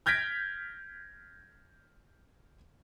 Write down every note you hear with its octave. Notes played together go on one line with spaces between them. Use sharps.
F6 G6 G#6 A#6 B6 D7